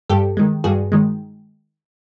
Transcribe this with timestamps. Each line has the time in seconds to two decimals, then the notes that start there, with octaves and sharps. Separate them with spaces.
0.09 G2 G4 A4
0.37 D#3 G#3
0.64 G2 F#4 G#4
0.92 D#3 G#3